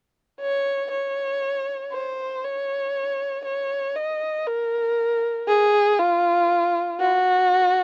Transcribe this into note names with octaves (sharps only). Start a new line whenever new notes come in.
C#5
C#5
C5
C#5
C#5
D#5
A#4
G#4
F4
F#4